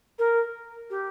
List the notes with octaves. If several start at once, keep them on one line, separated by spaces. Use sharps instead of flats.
A#4
G4